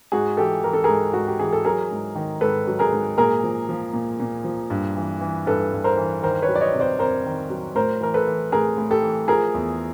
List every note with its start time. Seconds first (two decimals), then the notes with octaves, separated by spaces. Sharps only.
0.12 G#2 F#4 G#4
0.37 E3 G4 A4
0.63 E3 A#4
0.73 A4
0.84 G#2 G#4 A#4
1.13 G#2 F#4
1.27 G4
1.39 E3 G#4
1.53 A4
1.65 F#3 G#4 A#4
1.91 G#2
2.15 D#3
2.41 G#2 A4 B4
2.67 F#3
2.79 G#4 A#4
2.92 G#2
3.18 A#2 G#4 A#4
3.44 F3
3.69 F3
3.93 A#2
4.20 A#2
4.44 F3
4.70 G2
4.96 E3
5.21 E3
5.46 G2 A4 B4
5.73 G2
5.84 A#4 C5
5.97 E3
6.23 D#3 A#4 C5
6.42 B4 C#5
6.48 F#3
6.55 D5
6.61 C#5 D#5
6.74 C3
6.80 C5 D5
6.99 F2 A#4 C5
7.25 D#3
7.50 F#3
7.75 A2 A#4 C5
8.01 E3 A#4
8.14 A4 B4
8.27 E3
8.52 A2 G#4 A#4
8.78 A2
8.90 G4 A4
9.02 E3
9.28 F3 G#4 A#4
9.54 E2